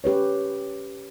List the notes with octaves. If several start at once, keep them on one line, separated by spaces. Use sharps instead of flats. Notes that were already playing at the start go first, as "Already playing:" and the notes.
C#4 G4 B4 C#5